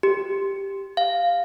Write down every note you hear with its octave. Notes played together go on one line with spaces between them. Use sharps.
G4
F5